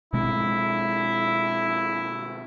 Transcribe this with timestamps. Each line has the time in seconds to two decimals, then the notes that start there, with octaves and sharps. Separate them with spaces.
0.13 B2 G#3 C4 E4